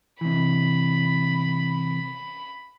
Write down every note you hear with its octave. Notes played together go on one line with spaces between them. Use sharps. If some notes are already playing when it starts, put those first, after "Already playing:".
C3 E3 B5